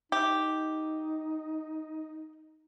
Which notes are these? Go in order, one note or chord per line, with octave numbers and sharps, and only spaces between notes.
D#4 G4